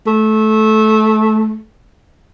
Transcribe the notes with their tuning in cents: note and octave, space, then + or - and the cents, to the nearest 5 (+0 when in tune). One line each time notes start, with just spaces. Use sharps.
A3 -20